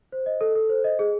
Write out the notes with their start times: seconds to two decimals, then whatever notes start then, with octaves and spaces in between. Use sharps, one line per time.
0.12 C5
0.26 D#5
0.41 A4
0.55 A4
0.69 C5
0.84 D#5
0.99 G#4